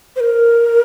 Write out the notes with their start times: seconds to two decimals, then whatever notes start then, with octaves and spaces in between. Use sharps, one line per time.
0.16 C5
0.20 A#4